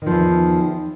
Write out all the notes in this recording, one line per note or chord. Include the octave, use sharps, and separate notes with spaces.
E2 D#3 F3